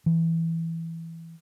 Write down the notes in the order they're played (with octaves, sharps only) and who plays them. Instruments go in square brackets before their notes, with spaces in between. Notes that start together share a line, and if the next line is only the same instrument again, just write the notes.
[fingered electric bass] E3